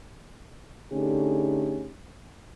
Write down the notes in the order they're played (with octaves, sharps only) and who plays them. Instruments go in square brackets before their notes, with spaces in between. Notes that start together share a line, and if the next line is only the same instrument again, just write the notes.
[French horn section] D3 A3 C#4 D#4 G4 G#4